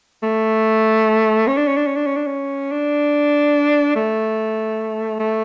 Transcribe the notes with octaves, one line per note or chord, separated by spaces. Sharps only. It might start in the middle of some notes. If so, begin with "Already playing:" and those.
A3
C#4
D4
C#4
D4
C#4
D4
C#4
D4
C#4
D4
A3
A3